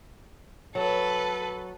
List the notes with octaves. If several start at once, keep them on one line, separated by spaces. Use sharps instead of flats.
F#3 A4 B4